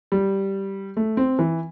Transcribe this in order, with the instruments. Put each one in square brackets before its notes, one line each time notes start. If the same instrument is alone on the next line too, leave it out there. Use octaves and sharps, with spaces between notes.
[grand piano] G3
A3
C4
E3